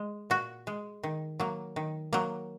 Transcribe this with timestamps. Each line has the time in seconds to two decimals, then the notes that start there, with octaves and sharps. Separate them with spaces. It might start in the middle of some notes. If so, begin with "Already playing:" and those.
Already playing: G#3
0.30 A#2 F#4
0.67 G#3
1.03 D#3
1.40 F#3 A#3
1.76 D#3
2.13 F#3 A#3